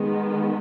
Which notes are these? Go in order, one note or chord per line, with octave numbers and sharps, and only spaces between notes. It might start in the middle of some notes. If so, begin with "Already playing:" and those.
Already playing: D#3 G#3 B3